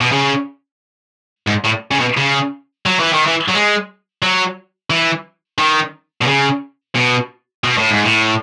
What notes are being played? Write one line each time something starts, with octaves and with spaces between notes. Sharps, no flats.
B2
C#3
G#2
A2
C#3
B2
C#3
F#3
E3
D#3
E3
F#3
G#3
F#3
E3
D#3
B2
C#3
B2
B2
A2
G#2
A2